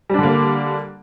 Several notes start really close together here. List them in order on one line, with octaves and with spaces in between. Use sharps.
G3 D4 D3 A#3